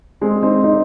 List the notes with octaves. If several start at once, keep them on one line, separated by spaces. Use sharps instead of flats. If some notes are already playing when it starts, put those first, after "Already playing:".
G#3 C4
C4 D#4
C4 D#4